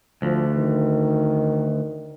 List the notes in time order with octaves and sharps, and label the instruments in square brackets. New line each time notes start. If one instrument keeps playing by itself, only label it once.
[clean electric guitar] D2 [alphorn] F3
[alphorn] D#3